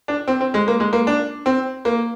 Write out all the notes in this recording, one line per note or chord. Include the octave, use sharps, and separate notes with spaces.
D4
C4
C4
G#3
A#3
G#3
A#3
D4
C4
A#3